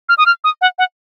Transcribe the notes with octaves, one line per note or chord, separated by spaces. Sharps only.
F6
D#6
F6
D#6
F#5
F#5